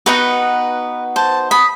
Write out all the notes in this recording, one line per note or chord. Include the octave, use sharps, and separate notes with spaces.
B3 D#4 F#4 B4
C5 A5
B5 D#6